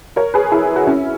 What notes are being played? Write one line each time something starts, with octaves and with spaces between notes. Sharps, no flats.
A#4 C#5
G#4 B4
E4 G#4
F#4
C#4 E4